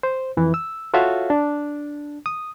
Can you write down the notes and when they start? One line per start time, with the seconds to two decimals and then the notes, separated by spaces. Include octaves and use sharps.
0.03 C5
0.37 F2 E3
0.54 E6
0.94 F4 F#4 A4 C#5 E5 F5
1.30 D4
2.26 D#6